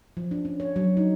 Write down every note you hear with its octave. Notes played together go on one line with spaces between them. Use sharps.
F3
D4
C#4
C#5
F#3
D#4